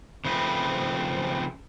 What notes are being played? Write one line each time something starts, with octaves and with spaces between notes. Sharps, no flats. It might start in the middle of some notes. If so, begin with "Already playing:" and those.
C#3 F3 A3 C4 B4